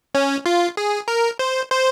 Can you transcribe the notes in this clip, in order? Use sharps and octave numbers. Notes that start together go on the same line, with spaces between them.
C#4
F4
G#4
A#4
C5
C5